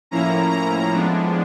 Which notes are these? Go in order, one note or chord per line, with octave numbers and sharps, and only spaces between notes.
A2 F3 A#3 C#4 E4 A#5
A#5
A2 F3 G#3 B3 D4